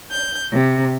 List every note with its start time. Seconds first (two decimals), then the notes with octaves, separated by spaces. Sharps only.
0.10 G6
0.51 C3